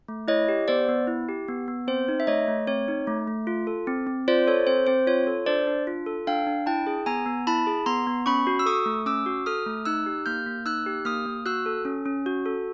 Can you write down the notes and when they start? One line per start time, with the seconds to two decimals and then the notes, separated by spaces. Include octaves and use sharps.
0.08 A3
0.28 E4 C#5 D#5
0.49 G4
0.68 B3 C5 D5
0.88 B3
1.07 E4
1.29 G4
1.48 B3
1.68 B3
1.87 C4 C5
2.08 D#4
2.20 E5
2.27 A3 C#5 D#5
2.48 A3
2.67 C4 C#5
2.88 D#4
3.07 A3
3.27 A3
3.47 F4
3.67 A4
3.87 C4
4.07 C4
4.28 F4 C5 D5
4.47 A4 C#5
4.67 C4 C5
4.87 C4 C5
5.07 F4 C#5
5.27 A4
5.46 D4 C5 D5
5.67 D4
5.87 F4
6.06 A4
6.27 D4 F5 G5
6.47 D4
6.66 E4 G5 A5
6.87 G#4
7.06 B3 G#5 A#5
7.26 B3
7.47 E4 A5 B5
7.67 G#4
7.86 B3 A#5 C6
8.07 B3
8.26 C#4 B5 C#6
8.47 F#4
8.59 E6
8.66 A4 C#6 D#6
8.86 A3
9.06 C#4 D6 E6
9.26 F#4
9.46 A4 D#6 F6
9.66 A3
9.85 D#4 E6 F#6
10.06 G4
10.26 A#3 F6 G6
10.46 A#3
10.66 D#4 E6 F#6
10.86 G4
11.05 A#3 D#6 F6
11.26 A#3
11.46 F#4 E6 F#6
11.66 A4
11.85 C#4
12.06 C#4
12.26 F#4
12.46 A4